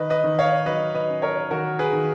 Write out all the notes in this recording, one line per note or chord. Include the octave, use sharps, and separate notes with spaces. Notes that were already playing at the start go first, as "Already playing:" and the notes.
Already playing: D#3 B4 D#5
B4 D#5
D#3
C#5 F5
F#3 B4 D#5
B4 D#5
C#4
A#4 C#5
D#3 F#4 A#4
G#4 B4
D#3